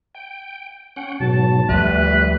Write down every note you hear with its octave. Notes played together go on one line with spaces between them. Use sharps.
G5
C#4 F#5 G5
G#2 B2 F#3 A5
D2 F3 G3 A3 B4